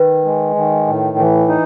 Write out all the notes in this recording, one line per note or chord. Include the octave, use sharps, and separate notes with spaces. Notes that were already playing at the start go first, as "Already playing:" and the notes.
Already playing: D#3 B4
G#3
D#3
A2
E3
D#4